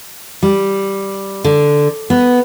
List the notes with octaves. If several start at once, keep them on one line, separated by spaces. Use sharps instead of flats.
G3
D3
B3